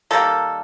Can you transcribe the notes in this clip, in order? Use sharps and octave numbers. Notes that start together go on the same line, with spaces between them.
D#3 G3 A#3 A4